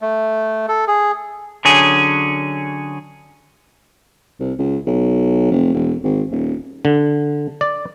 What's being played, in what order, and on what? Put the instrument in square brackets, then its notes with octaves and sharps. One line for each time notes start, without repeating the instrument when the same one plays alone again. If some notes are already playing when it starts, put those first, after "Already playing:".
[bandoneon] A3
A4
G#4
[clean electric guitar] D3 F#3 C#4 G#4
[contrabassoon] C2
C#2
B1
F1
E1
G#1
D#1
[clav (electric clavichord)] D3
D5